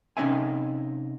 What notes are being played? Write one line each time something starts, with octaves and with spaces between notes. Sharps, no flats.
C3 C4 C#4 D#4 E5 G#5